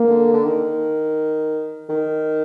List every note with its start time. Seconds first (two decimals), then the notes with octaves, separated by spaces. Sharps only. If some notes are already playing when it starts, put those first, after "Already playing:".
Already playing: A#3
0.09 D3
0.33 D3
0.45 D#3
1.89 D#3